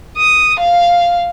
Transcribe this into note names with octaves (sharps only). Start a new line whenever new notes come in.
D#6
F5